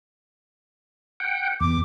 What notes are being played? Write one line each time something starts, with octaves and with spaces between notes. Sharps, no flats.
F#5 G5
E2 D6